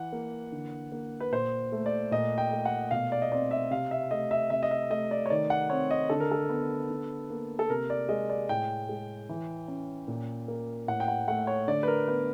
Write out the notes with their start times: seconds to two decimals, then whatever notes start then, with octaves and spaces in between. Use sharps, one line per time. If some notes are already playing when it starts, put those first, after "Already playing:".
Already playing: E3 F#5
0.12 A#3
0.52 D3
0.92 A#3
1.20 B4
1.32 A#2 C5
1.72 A3
1.86 D5
2.11 A#2 D#5
2.38 G5
2.51 A3
2.65 F#5
2.91 B2 F5
3.12 D5
3.22 D#5
3.32 C4 D5
3.51 E5
3.71 C3 F5
3.91 E5
4.11 A3 D#5
4.31 E5
4.50 C3 E5
4.63 D#5
4.71 E5
4.90 A3 D#5
5.11 D5
5.26 C#5
5.30 D#3 D5
5.50 F#5
5.70 C4 C#5
5.91 D#5
6.09 D3 A4
6.20 A#4
6.31 A4
6.49 B3
6.90 D3
7.30 A#3
7.59 A4
7.69 C3 A#4
7.90 D5
8.09 G#3 D#5
8.30 D5
8.49 A2 G5
8.89 G#3
9.29 E3
9.68 C#4
10.08 A#2
10.48 A#3
10.88 A2 F#5
11.00 G5
11.08 F#5
11.28 A3 F#5
11.47 C#5
11.68 D3 D5
11.83 B4
11.88 A#4
12.08 B3 B4